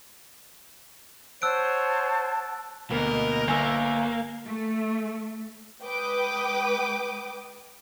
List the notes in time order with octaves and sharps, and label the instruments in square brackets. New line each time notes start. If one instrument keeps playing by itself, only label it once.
[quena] C5 [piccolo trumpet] C#5 [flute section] F#5 A5 [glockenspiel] E6 F#6 D7
[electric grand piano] D2 A#3 [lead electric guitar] B2 [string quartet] A#4 D#5
[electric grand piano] G1 G#5 E6 [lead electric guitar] A#3
[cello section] A3
[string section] G#3 B4 G5 D6 D#6